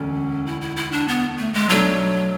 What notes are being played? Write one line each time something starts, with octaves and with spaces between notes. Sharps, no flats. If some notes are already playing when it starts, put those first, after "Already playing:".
Already playing: E1 D2 A3 C#4
E4
E4
E4
D4
B3
A3
G#3
B1 B2 F#3 A3 D4 A4